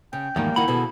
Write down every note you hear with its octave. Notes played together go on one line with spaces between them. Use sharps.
C#3 G5
E2 G#2 D#3 F3 G3 A#3
D#3 D#4 E4 F#5 B5
B2 B3 G#4 A4